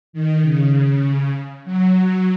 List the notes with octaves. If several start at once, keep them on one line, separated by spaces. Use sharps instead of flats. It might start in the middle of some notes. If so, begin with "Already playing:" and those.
D#3
C#3
F#3